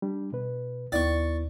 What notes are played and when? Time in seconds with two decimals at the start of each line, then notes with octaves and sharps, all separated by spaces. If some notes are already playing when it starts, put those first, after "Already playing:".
0.02 G3 D4
0.33 B2 B4
0.92 D#2 B3 E4 D5 C#6